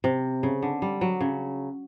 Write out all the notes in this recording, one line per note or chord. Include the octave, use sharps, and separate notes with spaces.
C3
C#3
D3
G3
F#3
C#3